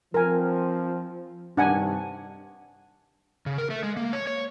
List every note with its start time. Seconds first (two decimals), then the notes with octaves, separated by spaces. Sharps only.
0.14 F3 C4 A#4 G#5
1.57 G2 C3 D#3 D4 F#5 G#5
3.46 C#3
3.58 A#4
3.70 A3
3.83 G#3
3.97 A#3
4.13 C#5
4.27 C#5